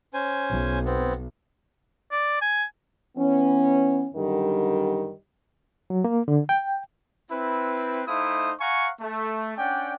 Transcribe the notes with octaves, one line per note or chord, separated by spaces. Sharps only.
C#4 C5 G#5
B1
B3 C4
D5
G#5
E3 B3 C#4
F#2 D3 D#3 G3
F#3
A#3
D3
G5
C4 E4 B4
A3 D#4 E4 C5 F5 D#6
F5 F#5 G#5 A#5 C#6
A3
C#4 D4 D5 F#5 G5